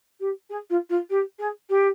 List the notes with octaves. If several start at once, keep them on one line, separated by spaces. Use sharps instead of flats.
G4
G#4
F4
F4
G4
G#4
G4